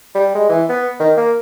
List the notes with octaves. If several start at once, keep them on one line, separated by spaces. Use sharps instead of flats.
G3
G#3
E3
B3
D#3
A#3